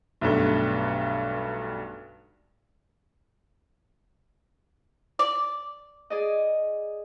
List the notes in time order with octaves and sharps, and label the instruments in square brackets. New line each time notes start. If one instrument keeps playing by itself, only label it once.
[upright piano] B1 G2 A3
[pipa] D5
[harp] G#4 D5 D#5